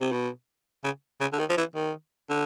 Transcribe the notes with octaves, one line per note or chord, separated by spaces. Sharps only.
C3
B2
C#3
C#3
D3
D#3
F3
E3
D#3
D3